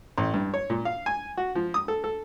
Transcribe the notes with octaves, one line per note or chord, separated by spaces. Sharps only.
A1
G2
C#5
A#2
F5
G#5
F#4
F3
D#6
A4
A4